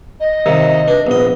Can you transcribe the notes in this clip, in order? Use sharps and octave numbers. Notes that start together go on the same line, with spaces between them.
D#5
D#2 C3 D#3
D4 B4
A#1 B3 D#5